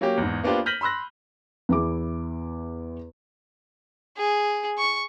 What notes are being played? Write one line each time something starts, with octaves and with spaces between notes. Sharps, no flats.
F#3 A#3 C#4 G4
E2 G#2
A#3 B3 D4 F4 G4 C5
F6 G6 A#6 B6 D#7 F#7
B5 C6 E6 F#6 A#6
E2 E4 G#4 D6
G#4
C#6